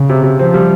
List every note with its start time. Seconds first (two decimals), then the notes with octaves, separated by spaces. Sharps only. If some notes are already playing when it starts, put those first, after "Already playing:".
Already playing: C#3
0.09 C3
0.24 C3
0.39 F3 C4
0.54 G3